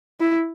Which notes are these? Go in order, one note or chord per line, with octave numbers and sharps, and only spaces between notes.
E4